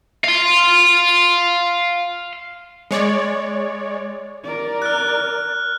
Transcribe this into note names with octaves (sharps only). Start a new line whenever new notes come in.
F5 C6
G#3 C#5 D5
A#4 D5
F6 F#6